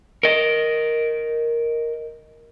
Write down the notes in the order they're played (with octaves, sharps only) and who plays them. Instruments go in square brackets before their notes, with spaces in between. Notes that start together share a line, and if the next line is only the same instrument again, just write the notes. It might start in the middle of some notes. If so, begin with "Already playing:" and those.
[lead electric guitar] A#4 D#5